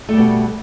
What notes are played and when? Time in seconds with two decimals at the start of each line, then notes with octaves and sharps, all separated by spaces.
0.09 A3
0.13 G3
0.17 B2